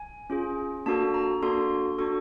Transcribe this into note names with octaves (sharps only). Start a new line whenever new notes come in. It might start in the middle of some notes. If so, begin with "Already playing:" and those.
Already playing: G#5
C#4 F4 G#4
A#3 D4 F#4 A4 A5
A#5
A#3 D4 F#4 A4 C6
D4 F#4 A4 C#6